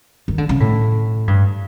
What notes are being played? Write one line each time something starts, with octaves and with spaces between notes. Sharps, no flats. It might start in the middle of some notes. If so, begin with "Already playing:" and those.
D#3
D3
C#3
A2
G2